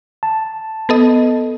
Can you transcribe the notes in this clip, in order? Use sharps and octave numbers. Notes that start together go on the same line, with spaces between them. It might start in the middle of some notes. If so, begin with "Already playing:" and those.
A5
B3 A4 D#5